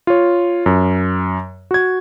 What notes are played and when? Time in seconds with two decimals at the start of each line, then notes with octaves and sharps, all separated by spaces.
0.07 F4 C#5
0.66 F#2
1.71 F#4 G#6